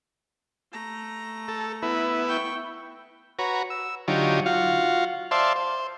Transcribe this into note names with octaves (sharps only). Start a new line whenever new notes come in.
A3 A#5
A4
B3 E4
G5 C#6
F#4 B4 C#5 A#5
E6
D3 F#3 D#4 F4 G4 C#5
F4 F#4 F5
C5 D5 E5 F5 A5 C6
C5